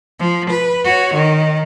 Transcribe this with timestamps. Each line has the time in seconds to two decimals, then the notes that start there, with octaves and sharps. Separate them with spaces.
0.20 F3
0.50 B4
0.84 F#4 C#5
1.14 D#3